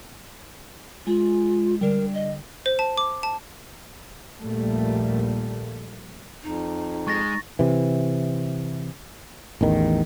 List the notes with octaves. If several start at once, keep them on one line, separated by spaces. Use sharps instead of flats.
G#3 F4
D3 G3 A#4
D#5
C5
A5
D6
A5
A#1 D#2 A#2 G3 A3 A#3
F2 D#4
G#3 C#6 A6 A#6
C3 E3
A1 E2 D#3